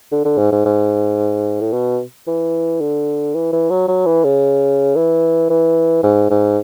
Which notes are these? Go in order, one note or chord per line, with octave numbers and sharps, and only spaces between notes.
D3
D3
G#2
G#2
G#2
A2
B2
E3
D3
E3
E3
F#3
F#3
E3
C#3
E3
E3
G#2
G#2